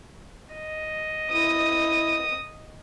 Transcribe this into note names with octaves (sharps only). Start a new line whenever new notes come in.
D#5
E4 D#6